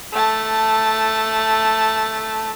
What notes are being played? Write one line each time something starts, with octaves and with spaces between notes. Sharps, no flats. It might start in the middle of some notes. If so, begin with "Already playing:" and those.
A3 A5